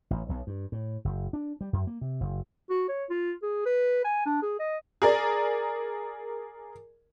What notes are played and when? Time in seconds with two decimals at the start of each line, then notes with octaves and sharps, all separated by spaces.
0.11 A1
0.29 B1
0.47 G2
0.72 A2
1.05 F#1
1.33 D4
1.61 G3
1.73 F#2
1.87 A#3
2.01 C3
2.21 F#1
2.70 F#4
2.89 C#5
3.10 F4
3.43 G#4
3.66 B4
4.04 G#5
4.26 D4
4.42 G#4
4.60 D#5
5.02 G#4 A#4 D5